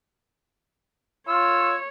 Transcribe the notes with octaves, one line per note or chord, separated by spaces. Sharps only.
F4 C#5 E6